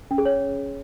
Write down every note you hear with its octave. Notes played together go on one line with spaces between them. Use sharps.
C#4
G#4
C#5